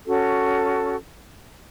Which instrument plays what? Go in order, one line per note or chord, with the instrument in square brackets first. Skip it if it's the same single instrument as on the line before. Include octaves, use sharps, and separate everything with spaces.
[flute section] C#4 F#4 A4